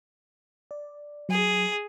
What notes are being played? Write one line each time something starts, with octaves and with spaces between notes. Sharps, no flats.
D5
F#3 G#4